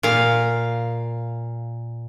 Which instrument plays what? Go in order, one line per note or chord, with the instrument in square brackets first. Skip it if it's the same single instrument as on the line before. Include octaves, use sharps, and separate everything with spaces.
[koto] A#2 F5